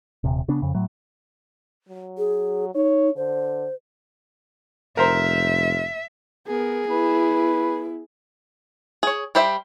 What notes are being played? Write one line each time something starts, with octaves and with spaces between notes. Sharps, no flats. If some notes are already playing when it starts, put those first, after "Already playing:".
D#1 C3
C#3 B3 D4
F2 C#3
A2 F#3
F#3
G#4
D#4 C#5
D3 C5
F1 A#4 C5 E5 A#5
B3 G#4 A#4
B3 E4 B4
G#4 C#5
G3 G4 C5 E5